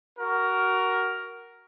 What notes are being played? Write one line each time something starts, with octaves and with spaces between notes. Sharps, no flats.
F#4 A#4